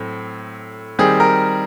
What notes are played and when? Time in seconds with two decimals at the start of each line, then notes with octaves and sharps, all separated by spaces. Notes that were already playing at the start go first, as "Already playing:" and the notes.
Already playing: A2 F#3 A3 C4
0.99 D#3 G3 C4 G#4
1.20 A#4